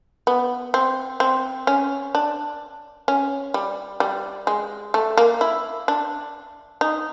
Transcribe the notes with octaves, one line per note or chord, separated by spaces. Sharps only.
B3
C4
C4
C#4
D4
C#4
G3
G3
G#3
A3
A#3
E4
D4
D#4